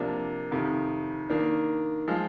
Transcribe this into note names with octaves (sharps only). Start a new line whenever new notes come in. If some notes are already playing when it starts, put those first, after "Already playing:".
Already playing: C3 F3 A#3 D4
F2 C3 D#3
D#3 A#3 D4
F3 G#3